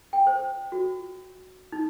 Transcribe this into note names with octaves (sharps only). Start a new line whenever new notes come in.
G5
C5
F#4
D#4